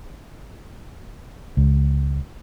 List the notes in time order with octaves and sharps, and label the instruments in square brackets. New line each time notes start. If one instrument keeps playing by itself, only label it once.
[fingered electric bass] C#2